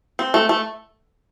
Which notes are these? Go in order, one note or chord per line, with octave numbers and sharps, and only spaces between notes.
C4
A3
A3